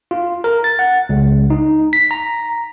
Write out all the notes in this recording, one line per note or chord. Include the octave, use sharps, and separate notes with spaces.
F4
A#4
A6
F#5
C#2
D#4
B6
A#5